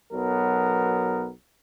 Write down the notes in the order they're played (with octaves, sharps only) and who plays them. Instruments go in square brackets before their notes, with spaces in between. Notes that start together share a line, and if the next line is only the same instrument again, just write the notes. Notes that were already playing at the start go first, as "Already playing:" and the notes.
[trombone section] B1 F#3 B3 A#4